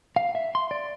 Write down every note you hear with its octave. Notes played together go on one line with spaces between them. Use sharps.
F5
E5
C6
D5